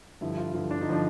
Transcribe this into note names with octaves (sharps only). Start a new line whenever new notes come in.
G2 D3 F3 E4
F4
G2 D3 F3
D4
D#4
D3 F3 D4